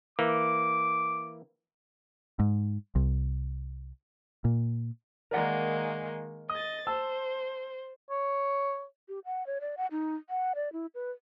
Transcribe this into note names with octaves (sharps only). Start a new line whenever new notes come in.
E3 A#3 D6
G#2
C2
A#2
D#3 G#3 A#3 A#4 D5 F#5
D#5 D#6 A6
C5 A5 E6
C#5
G4
F#5
C#5
D5
F#5
D#4
F#5
D5
E4
B4